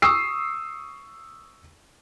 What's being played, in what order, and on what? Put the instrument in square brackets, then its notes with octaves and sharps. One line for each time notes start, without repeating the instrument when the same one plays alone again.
[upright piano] C#6 D#6 E6 C7